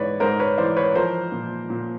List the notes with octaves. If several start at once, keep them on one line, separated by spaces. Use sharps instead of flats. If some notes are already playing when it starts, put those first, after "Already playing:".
Already playing: G#2 E3 B4 C#5 D5
G#2 A#4 C5
B4 C#5
E3 C5 D5
B4 C#5
F3 A#4 C5
A#2
A#2